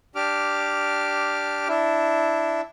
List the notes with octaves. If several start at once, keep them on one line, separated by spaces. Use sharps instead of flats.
D4 G4 D6 F6
D4 E4